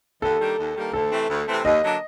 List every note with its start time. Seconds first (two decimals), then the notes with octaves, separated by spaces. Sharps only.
0.22 D#2 A4
0.40 D#3 G3 A#3 D4
0.59 D#2
0.76 D#3 G3 A#3 D4
0.93 D2 A4
1.11 C3 E3 A3 C4
1.29 D2
1.48 C3 E3 A3 C4
1.65 D#2 D#5
1.83 D3 F#3 A#3 D4